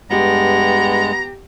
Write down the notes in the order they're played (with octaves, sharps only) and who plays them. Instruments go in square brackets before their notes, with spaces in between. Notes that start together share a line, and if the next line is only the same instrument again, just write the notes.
[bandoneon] G2 G#3 [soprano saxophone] B3 [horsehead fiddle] G4 [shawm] A#5